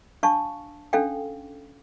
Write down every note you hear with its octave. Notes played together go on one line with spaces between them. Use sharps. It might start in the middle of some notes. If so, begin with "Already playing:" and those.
D4 F5 A5 C#6
C#4 D4 A4 F5 G5